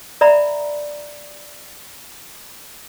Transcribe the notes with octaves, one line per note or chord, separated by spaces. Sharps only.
D5 E5 A#5 B5